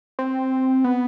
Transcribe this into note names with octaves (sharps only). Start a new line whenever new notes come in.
C4
B3